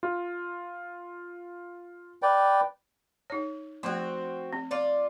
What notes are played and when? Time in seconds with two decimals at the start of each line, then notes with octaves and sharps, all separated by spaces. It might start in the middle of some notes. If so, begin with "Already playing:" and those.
0.03 F4
2.22 B4 D5 G5
3.30 D#4 C#5
3.83 F3 A3 C4 F#4
4.53 C4
4.71 F4 D5